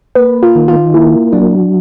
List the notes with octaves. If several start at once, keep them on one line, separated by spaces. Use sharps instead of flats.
A#3 B4
F4
D#3
F4
A#3 E4
F#3 D4